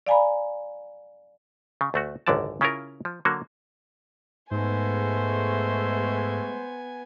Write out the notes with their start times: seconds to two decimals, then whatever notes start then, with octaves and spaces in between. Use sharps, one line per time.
0.07 D5 F5 G#5 A#5 B5
1.81 C#3
1.94 D2 A3 F#4
2.27 G#1 C#2 F#2 D3 D5 A5
2.61 C#3 C#4 E4 F4 A#4
3.05 F3
3.25 D3 F#3 A#3 F#4
4.51 G#2 G#3 A3 B3 C5 G#5